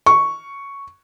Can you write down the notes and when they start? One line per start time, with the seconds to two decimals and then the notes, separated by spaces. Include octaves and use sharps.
0.06 C#6